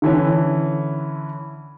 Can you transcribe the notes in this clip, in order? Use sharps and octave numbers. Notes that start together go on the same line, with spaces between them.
D3 E3 C#4